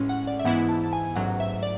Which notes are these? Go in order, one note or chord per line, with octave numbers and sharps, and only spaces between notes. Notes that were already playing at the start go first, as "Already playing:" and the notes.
Already playing: A1 A2 G#3 C#4
F#5
D5
E5
G#2 E3 B3 E4 F#5
A5
A5
G#5
A1 G#2 F#3 F#5
E5
D5